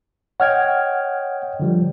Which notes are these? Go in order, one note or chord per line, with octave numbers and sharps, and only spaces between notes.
C#5 D#5 F#5 G5 F6 G#6
D3 F3 G3